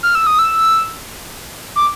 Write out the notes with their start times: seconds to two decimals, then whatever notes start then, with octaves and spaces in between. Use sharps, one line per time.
0.03 F6
0.15 E6
0.27 D#6
0.39 E6
1.76 D6